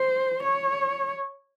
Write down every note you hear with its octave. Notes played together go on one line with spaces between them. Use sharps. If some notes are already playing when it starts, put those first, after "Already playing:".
Already playing: C5
C#5